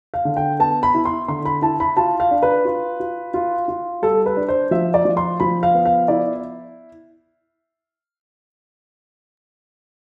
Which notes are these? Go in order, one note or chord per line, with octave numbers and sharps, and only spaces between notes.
F5
D3
G5
B3 A5
B5
E4
C6
D3 C6
B5
E4 A5
B5
F4 A5
F5
D4
B4
F4
F4
F4
F4
G3 A4
B4
D4
C5
F3 E5
D5
F3
C6
F3 B5
F5
B3
F5
E4 D5